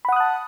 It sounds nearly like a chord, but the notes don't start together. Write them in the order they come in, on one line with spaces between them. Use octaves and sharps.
B5 F#5 D#6 F#6 A5